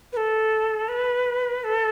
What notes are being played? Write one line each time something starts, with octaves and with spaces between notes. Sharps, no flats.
B4
A4
B4
A4